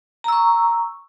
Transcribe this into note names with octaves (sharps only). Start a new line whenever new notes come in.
A#5 C#6 E6